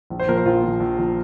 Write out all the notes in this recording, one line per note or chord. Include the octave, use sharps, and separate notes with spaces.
A#1
C5
A#2 F3 A#4
C5
A#1 F4
A#2 F3
A#1
A#2 F3